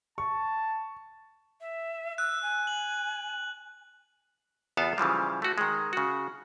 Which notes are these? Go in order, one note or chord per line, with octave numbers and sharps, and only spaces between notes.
A5 C#6
E5
E6 F#6
G#5
F#7
E2 B3 F4 A4 F5 A5
C#3 E3 F3 G3
A3 F#4
D#3 G#3
C#3 F#4